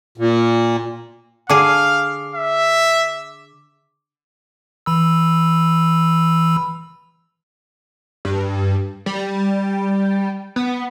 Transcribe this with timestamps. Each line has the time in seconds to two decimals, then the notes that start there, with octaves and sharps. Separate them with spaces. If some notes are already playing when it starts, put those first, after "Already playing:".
0.18 A#2
1.50 D3 G#4 F5 D6
2.35 E5
4.86 E3 B5 E6
8.25 G2
9.06 G3
10.56 B3